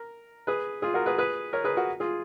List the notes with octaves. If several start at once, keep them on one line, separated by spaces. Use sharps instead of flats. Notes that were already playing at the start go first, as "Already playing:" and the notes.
Already playing: A#4
G#4 B4
F4 G#4
F#4 A#4
G#4 B4
G#4 B4
A#4 C#5
G#4 B4
F#4 A#4
F4 G#4